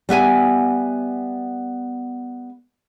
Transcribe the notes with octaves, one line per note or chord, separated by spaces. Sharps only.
G3 B3 E5 G#5